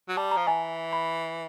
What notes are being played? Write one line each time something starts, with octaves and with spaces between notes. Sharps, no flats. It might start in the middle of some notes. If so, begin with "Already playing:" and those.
F#3
G3 A5
A#5
F3
E3 G#5
B5